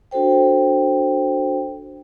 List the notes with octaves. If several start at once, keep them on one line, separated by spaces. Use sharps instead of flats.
D4 F#4 A4 C5 G5